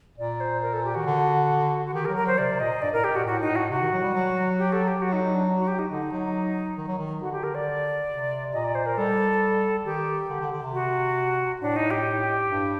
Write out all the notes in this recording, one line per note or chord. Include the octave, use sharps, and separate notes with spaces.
A#2 D5
C5
A#4
A4
G4
D#3 F#4
D3
F#4
D#3 G4
A#4
F#3
A#4
F#3 C5
C3 D5
C3
A#2 D#5
G2 D5
A2 A#4
G4
A#2 F#4
A2 F#4
D#4
A2
F#4
C3 F#4
D#3
F#3
G3
F#3
G4
A4
G4
F#3 F#4
D#4
D#4
D4
F#4
G4
D#4
D3 D#4
F#3
D#3
F#3
D#3
D3 F#4
G4
A#4
D5
C3
A#2 D#5
D5
C5
A#4
G3 A4
D#3 G4
D3
D3
D3
C3
F#4
A2 D4
D#4
G4
G2